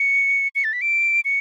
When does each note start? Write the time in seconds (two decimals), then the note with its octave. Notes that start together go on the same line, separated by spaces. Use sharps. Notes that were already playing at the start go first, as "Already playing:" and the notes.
Already playing: C#7
0.55 C#7
0.64 A6
0.73 B6
0.81 D7
1.25 C#7